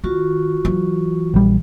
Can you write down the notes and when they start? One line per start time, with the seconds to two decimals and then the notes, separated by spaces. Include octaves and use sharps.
0.04 D#3 F4 F#4 C#6
0.65 E3 F#3
1.34 A#1 G3